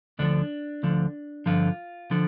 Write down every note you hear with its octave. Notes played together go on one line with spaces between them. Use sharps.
D2 D3 F3 D4
D2 D3 F3
G2 D3 F3 F4
D3 F3